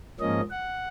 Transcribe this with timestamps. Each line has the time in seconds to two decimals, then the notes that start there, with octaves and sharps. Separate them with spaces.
0.20 G#2 F3 A#3 C#4 D#5
0.50 F#5